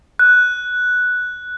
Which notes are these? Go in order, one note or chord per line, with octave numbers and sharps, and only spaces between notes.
F#6